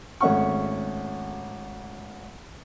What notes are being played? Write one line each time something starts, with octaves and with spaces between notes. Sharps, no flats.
G#1 A3 C#4 F#5 C#6